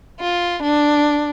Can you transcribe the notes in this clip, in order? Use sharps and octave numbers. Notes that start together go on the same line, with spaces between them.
F4
D4